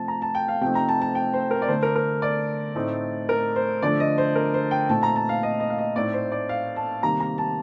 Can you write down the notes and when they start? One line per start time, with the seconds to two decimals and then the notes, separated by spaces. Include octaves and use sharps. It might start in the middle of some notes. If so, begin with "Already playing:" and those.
Already playing: C3 F3 A3 A5
0.08 A#5
0.22 A5
0.35 G5
0.48 F5
0.61 C3 F3 A3 C4 D#4 G5
0.75 A#5
0.89 A5
1.02 A5
1.15 G5
1.33 C5
1.51 A#4
1.62 D5
1.68 D3 A3 D4 C5
1.83 A#4
1.96 A#4
2.22 D5
2.75 A2 A3 C4 D#4
3.29 A#4
3.56 C5
3.82 D3 F3 A3 D4 D5
4.00 D#5
4.18 C5
4.35 A#4
4.54 C5
4.71 G5
4.89 A#2 A3 C4 D#4 A5
5.03 A#5
5.16 A5
5.29 F5
5.43 D#5
5.60 D#5
5.70 F5
5.78 D#5
5.96 A2 A3 C4 D#4 D5
6.14 C5
6.32 D5
6.49 F5
6.76 A5
7.03 C3 D#3 G3 A#3 A#5
7.20 A#5
7.38 A5